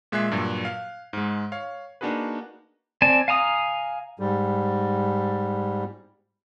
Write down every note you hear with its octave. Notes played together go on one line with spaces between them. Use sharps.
A#2 G#3 E5 F#6 G#6 C7
G2 A#2 F#3
F5
G#2 G#3
C#5 F5
A#3 D4 D#4 F#4 G#4 B4
C4 D5 G#5 A5
F5 G#5 A#5 D#6
G#2 G3